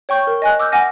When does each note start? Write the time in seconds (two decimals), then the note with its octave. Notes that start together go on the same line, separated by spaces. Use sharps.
0.09 C#5 G5 C#6 G6
0.27 A#4
0.42 D#5 G#5 F#6
0.59 D6 E6 F6 G6
0.72 F#5 G#5 F6 A#6